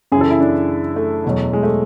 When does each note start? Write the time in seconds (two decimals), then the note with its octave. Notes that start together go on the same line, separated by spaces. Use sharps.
0.12 F#2 C#3 E3 G#4
0.21 A4
0.31 E4
0.40 D4
0.96 A3
1.25 E2 B2 F#3
1.53 G#3
1.63 A3